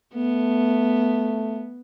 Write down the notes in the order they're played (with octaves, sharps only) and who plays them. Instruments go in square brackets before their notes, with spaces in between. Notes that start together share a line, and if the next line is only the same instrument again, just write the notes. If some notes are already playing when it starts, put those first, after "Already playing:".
[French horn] A3 [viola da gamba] B3